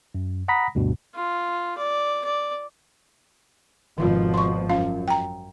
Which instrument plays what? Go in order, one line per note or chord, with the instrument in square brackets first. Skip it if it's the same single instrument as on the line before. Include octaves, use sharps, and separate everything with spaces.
[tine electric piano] F#2
F#5 A#5 B5 D#6 A#6 B6
D2 G2 B2
[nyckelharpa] F4
D5
D5
[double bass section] G#1 B2 F3 [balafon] D#3 F4
[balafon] C6 C#6
[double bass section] F#2 [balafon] C#4 F4 F5
[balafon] G5 A#5